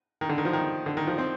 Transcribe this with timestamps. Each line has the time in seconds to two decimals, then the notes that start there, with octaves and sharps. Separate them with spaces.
0.21 D#3
0.29 D3
0.38 D#3
0.45 F3
0.53 D#3
0.86 D3
0.97 D#3
1.07 F3
1.18 C4